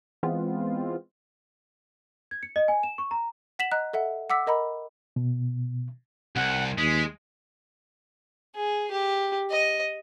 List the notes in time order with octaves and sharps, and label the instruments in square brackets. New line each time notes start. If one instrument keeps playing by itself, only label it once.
[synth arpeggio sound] E3 G#3 B3 C4 F4
[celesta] G#6
C#7
D#5
G#5
E7
C#6
A#5
[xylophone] F#5 B6 E7 F#7
D#5 A#5 F#6
A4 E5 F#5
F#5 D6 E6 B6
A#4 D#5 A#5 B5
[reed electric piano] B2
[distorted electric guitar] C2 [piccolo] F#5
[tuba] D#2 [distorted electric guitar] G#3 [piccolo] B6
[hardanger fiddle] G#4
G4
D#5